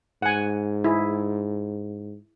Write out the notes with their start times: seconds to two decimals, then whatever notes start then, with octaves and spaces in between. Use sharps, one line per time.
0.22 G#2 F#5 G#5
0.84 E4 G#4